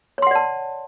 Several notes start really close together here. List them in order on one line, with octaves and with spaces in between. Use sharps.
C#5 C6 F#5 D5 A5